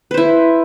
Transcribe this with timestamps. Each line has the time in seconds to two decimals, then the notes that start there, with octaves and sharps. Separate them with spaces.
0.11 B4
0.14 C5
0.17 E4